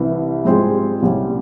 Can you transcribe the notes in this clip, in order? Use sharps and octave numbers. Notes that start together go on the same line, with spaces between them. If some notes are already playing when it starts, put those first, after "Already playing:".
Already playing: C2 C3 E3
G#2 G3 C4 F4 G#4
C2 A#2 G3 C#4